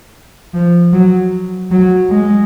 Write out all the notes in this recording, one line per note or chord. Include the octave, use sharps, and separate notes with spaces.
F3
F#3
F#3
G#3